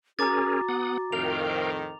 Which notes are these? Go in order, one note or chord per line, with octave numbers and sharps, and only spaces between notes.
C#4 F#4 G#4 A#4 A#5 D6 A6
B3 F#5 D#6
F2 A2 D#3 A#4 F5 G5 F7